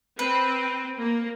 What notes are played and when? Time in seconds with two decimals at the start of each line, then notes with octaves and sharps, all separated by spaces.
0.19 C4 B4
0.99 A#3